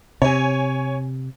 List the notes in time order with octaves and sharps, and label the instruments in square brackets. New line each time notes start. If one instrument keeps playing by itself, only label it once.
[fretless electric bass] C3 [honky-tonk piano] C#5 G#5